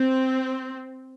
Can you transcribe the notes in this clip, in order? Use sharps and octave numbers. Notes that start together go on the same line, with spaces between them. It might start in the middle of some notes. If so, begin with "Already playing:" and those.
Already playing: C4